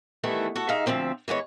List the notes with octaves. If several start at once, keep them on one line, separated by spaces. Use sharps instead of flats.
D#3 E3 G3 A3 B3 E4
F#4 A4 F#5
G#2 G#3 D#4 E5 F5
D2 A#2 F3 C4 E5
E3 G#3 B3 C#5